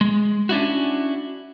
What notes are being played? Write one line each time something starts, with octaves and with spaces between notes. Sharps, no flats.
G#3
C#4 D4 E4 F#4